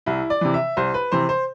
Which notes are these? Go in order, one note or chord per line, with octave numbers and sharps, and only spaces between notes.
C2 E4
D5
C3 E3
E5
C2 C5
B4
C3 E3 C5
C5